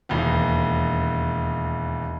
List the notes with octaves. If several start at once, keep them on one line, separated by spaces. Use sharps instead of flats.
E1 D#2